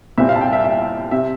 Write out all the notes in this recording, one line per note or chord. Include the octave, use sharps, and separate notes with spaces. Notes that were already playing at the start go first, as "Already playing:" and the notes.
C2 A#2 G3 C4 E5
F5
A5
G5
E5
E5
C3 E5